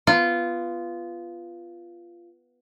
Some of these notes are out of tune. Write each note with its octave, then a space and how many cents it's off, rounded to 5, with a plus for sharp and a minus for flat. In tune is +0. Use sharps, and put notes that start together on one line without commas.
B3 +0 F4 -15